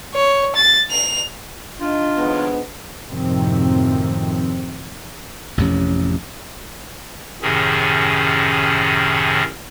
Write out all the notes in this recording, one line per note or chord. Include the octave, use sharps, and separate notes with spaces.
C#5
A6
F7
D#3 D4 F4
D#2 F3 G#3 B3
F#2 A2 C3 D#3 F3 C4
A1 F2 C3 C#4
F#2 A2 C3 D#3 C#4 G#4